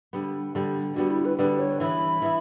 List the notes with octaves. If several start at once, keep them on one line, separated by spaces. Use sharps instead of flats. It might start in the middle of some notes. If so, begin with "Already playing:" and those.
D3 G3 B3
D3 G3 B3
D3 G3 B3 F#4
E4
B4
D3 G3 B3 B4
C#5
E3 B3 E4 B5
E3 B3 E4